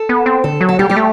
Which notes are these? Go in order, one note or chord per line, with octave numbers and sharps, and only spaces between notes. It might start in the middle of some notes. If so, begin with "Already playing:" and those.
Already playing: A4
B3
C4
D3 A4
F#3
A4
G3 G4
G3 G4
A3